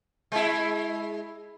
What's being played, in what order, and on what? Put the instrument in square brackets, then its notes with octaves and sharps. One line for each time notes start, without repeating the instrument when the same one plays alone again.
[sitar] G#3 E4